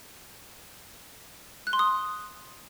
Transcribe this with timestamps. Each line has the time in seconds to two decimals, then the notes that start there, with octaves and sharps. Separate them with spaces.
1.67 F#6
1.73 C6
1.79 D#6